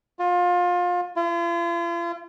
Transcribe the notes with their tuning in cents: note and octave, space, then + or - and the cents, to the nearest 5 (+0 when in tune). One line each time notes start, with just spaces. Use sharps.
F4 +25
F4 -45